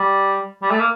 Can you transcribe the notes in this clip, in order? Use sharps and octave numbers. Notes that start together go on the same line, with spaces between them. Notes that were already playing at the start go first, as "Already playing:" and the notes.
Already playing: G3
G3
A3
A#3